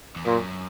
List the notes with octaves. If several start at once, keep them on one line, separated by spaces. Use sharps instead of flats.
E2
F#2 A#2